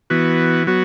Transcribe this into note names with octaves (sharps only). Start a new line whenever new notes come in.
E3 B3 F#4
F#3 B3 F#4